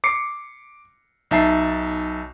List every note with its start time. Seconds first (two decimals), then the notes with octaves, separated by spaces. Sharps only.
0.04 D6 C7 C#7
1.31 B1 D#4 E5 A5 C7